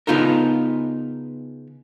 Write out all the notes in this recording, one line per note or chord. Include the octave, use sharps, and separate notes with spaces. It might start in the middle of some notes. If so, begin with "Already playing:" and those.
C#3 B3 D#4 F4 A4 A#4